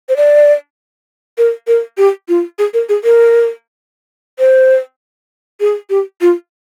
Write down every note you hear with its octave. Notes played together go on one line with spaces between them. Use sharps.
C5
D5
A#4
A#4
G4
F4
G#4
A#4
G#4
A#4
C5
G#4
G4
F4